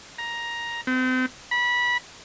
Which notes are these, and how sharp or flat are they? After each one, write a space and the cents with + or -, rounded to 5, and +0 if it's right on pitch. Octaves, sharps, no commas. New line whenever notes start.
A#5 +10
C4 -35
B5 -20